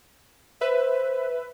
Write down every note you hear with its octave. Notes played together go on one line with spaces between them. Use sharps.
B4 C5 E5